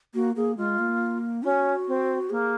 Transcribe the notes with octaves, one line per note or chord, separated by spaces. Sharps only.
A#3 F#4
A#3 G#4
G#3 F4
A#3
C#4 F#4
C4
A#3 G#4